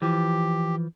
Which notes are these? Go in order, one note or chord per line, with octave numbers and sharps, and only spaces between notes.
E3 F3 G4